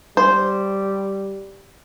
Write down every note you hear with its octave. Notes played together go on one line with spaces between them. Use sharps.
G3 C5